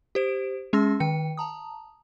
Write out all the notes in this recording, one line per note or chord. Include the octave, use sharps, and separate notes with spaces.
G4 C5 D7
G#3 C#4 G#4 C6 E6 A#6
D#3 G5 C#7
A5 A#5 D#6